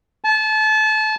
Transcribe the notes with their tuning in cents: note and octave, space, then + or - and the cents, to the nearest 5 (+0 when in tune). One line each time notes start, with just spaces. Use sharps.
A5 -30